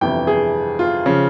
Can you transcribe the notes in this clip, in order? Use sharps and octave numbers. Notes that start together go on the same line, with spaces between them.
G1 F2 C3 E3 G5
G#4
F4
C#3 F3